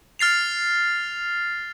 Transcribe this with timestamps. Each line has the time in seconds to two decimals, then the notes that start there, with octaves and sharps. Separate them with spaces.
0.19 F6 A6 C7 F7